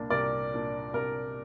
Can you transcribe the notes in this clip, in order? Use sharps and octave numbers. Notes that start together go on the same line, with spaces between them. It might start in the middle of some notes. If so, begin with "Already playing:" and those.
Already playing: C2 A#2 A#3 D4
C2 A#4 D5
A#2 A#3 D4
C2 A#4